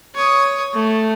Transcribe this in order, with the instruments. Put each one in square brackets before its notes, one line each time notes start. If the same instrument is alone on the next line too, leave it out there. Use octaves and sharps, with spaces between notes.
[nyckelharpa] C#5 D#6
A3